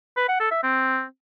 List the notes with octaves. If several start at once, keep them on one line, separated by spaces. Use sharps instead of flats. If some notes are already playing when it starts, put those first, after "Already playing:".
B4
F#5
A4
E5
C4